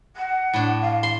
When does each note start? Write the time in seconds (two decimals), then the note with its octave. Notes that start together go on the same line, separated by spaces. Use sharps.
0.16 F#5
0.53 A2 D4
0.81 F5
1.03 C6